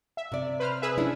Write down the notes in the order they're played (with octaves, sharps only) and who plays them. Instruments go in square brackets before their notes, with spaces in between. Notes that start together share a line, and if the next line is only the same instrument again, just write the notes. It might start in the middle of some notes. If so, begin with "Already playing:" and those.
[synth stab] E5
[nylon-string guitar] C3 D5
[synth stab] B4 C5 F6
G#4 B4 E5
[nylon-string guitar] C#4 D4 E4